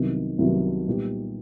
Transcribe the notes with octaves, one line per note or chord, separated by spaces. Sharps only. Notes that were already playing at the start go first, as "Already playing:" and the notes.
Already playing: C2 C3 D#3 F#3 B3
C2 C3 D#3 F#3 B3
A#2 G3 B3 D#4 G4